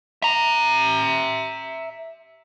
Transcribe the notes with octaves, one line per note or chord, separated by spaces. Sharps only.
E5 A#5